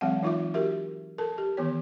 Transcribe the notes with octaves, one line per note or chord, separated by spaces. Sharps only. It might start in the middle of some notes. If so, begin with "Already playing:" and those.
E3 F#3 G#3 C4 F5 F#5
E3 D#4 F4 E5 D6
F#4 G4 A#4 E5
A4 A#4 A5
G4
D#3 E3 B3 C#5